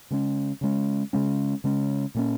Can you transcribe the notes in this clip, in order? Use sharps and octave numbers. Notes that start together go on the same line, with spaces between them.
C#3 G#3 C#4
C#3 G#3 C#4
C#3 G#3 C#4
C#3 G#3 C#4
A#2 A#3 C#4